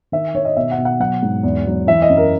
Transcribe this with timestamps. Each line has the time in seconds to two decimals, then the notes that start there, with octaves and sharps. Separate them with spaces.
0.12 D#3 E5
0.34 D#3 C#5
0.45 D#5
0.57 B2 E5
0.71 F#5
0.78 B2
0.85 F#5
1.00 F#3 F#5
1.22 G#2
1.43 E2
1.66 F#3
1.87 E3 E5
2.02 D#5
2.09 F#2
2.17 A#4